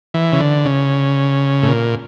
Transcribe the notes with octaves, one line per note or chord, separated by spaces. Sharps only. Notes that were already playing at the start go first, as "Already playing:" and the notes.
E3
C#3
D3
C#3
A2
A#2